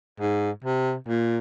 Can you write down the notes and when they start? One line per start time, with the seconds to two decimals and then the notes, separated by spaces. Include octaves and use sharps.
0.20 G#2
0.65 C3
1.08 A#2